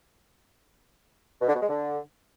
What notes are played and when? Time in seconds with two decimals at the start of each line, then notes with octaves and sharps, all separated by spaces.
1.41 B2
1.48 D3
1.55 B2
1.62 G#3
1.69 D3